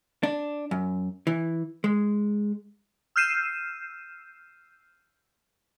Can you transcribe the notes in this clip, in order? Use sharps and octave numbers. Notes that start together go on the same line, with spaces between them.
D4
F#2
E3
G#3
E6 F6 G6 C7 D#7 E7